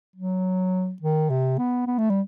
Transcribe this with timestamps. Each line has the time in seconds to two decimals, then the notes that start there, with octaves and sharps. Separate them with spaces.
0.16 F#3
1.02 D#3
1.30 C3
1.58 B3
1.87 B3
1.98 A3
2.10 G3